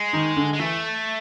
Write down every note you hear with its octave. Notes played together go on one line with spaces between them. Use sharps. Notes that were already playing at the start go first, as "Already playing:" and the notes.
Already playing: G#3
D#3 D#4
D3 D4
G#3
E3 A3 E4